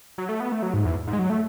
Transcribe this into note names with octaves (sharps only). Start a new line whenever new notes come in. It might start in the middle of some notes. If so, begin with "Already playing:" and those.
F#3
A3
B3
A3
F#3
G#2
E2
G#2
G#3
F#3
A3